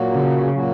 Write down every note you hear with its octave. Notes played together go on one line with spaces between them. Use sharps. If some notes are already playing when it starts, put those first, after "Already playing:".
Already playing: A#2 F#3 A#3 F#4
C#3
A#2 F#3 A#3 F#4